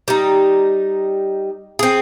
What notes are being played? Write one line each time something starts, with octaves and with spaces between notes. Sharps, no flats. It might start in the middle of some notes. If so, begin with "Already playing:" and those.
G3 D#4
C4 G#4